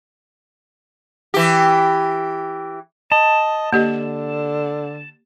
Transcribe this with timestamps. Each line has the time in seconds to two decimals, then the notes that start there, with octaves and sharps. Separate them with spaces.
1.34 E3 G4
3.12 D#5 A5
3.73 D3 A#3 G4 D#5